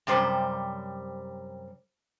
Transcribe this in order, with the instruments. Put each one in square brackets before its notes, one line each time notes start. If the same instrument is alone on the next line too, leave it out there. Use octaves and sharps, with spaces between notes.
[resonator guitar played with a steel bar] F#2 C3 G3 C5